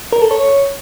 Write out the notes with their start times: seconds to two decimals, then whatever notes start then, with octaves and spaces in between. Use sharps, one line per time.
0.13 A#4
0.22 A4
0.31 C#5